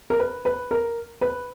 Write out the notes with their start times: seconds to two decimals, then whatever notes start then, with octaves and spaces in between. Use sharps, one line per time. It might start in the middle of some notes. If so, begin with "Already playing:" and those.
0.10 A#4
0.19 B4
0.45 B4
0.71 A#4
1.21 B4